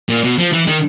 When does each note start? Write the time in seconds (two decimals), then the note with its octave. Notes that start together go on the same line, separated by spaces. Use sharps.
0.09 A#2
0.24 B2
0.38 F3
0.53 E3
0.67 D#3